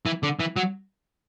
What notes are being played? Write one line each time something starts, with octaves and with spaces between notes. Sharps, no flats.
E3
D3
E3
F#3